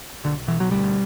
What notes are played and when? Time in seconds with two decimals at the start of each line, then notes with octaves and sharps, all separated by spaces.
0.24 B1 D3
0.48 B2 E3
0.60 F#3
0.71 D2 G3